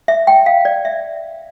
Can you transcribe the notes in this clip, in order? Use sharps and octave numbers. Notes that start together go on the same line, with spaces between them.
E5
G5
F5
D5
E5